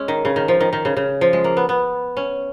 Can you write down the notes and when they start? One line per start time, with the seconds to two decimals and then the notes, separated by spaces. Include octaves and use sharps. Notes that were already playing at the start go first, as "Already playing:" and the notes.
Already playing: G#3 C#4
0.08 D#3
0.25 C#3
0.36 D#3
0.48 F3
0.61 D#3
0.73 D#3
0.85 C#3
0.97 C#3
1.21 F3
1.33 G#3
1.44 A#3
1.57 B3
1.69 B3
2.17 C#4